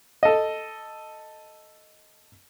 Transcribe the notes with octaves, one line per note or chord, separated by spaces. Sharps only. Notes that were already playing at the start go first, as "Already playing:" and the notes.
A4 D#5